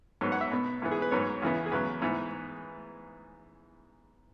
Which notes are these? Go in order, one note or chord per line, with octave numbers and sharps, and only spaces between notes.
G#2 F#3 B3 C#5
F#5
E5
B2 B3
G#2 E3 B3
G#4
B4
G#2 F#3 B3 C#5
E2 C#3 E3 B3
G#4
E2 C#3 F#3 B4
G#2 E3 B3